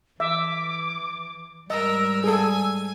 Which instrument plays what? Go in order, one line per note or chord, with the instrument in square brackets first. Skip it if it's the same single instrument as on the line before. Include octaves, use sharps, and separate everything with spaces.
[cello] E3 [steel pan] E5 [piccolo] D6
[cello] G#2 G3 [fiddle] A#4 [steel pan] D#5 [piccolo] E6
[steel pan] G#4 A4 [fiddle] G#5